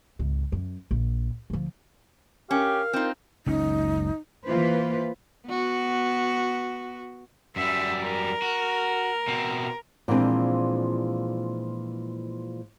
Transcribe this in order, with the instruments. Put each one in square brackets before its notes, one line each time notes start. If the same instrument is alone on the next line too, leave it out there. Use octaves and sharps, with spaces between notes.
[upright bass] G#1 C#2
F#2
A#1
D2 F3
[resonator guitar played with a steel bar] C#4 [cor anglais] G4 [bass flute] A#4 [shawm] F5
[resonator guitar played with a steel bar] C4 D#4 [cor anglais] F4
[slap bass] F#1 C#2 C#4 [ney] D#4
[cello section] E3 A#3 F4 B4 C5
[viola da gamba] B3 F#4
[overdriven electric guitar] F#2 G3 [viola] E5
[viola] A#4
[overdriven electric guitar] F#4
B2 C4
[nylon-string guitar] A#2 E3 F3 G#3 C4 D4